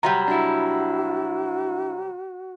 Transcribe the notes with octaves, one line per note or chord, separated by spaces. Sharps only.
C3 F#3 G3 A#5
D4 E4 F#4